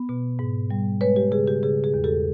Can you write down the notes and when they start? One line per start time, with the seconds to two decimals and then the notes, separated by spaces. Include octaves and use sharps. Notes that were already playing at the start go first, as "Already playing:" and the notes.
Already playing: B3
0.09 B2
0.39 G#2
0.71 G3
1.01 G#3 B4 C#5
1.16 G4
1.31 C#3 G#4
1.48 G4
1.63 C#3 G#4
1.84 G#4
1.94 E2
2.04 G4 A4